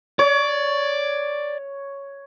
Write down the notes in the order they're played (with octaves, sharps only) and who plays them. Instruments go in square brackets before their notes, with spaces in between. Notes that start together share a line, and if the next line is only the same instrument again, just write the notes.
[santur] C#5 [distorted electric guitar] D5